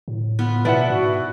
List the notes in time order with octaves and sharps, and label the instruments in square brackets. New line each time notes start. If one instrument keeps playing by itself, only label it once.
[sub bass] A2
[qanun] B3 F4 B4
[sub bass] B2 [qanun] E4 D5 A5 [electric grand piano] B4 E5 F#5
[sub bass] G#2 [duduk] F#4